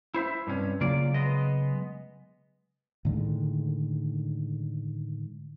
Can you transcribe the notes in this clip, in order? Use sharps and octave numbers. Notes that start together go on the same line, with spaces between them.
E4 C5 E5
G2 C3 C#4
C#3 F#3 A#3 F4 D5
G#3 B3 D#5
A2 D3 D#3 G#3